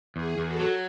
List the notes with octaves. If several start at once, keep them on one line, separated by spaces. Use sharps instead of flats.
E2 G#4
E2
F#4 A4
F#3